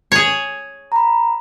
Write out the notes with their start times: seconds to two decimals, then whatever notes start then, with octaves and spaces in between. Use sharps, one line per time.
0.12 G#4 C#5
0.92 A#5 B5